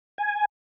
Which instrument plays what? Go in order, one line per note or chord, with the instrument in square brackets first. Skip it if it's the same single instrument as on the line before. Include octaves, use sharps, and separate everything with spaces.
[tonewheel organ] G#5